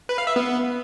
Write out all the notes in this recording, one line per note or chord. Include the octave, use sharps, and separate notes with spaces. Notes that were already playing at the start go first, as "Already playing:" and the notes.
B4
F5
E5
B3